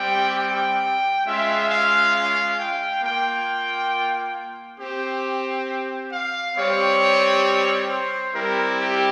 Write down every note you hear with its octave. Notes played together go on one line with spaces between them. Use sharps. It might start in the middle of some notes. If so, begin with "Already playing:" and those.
Already playing: G3 C4 G4 G5
G5
G#3 C#4 F4 E5
F5
F5
G5
A#3 F4 G5
C4 G4
F5
G3 C4 G4 C#5
C5
G3 C4 E4 G4 A#4
G4